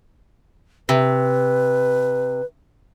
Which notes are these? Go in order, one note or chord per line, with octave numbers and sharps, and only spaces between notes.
C3 B4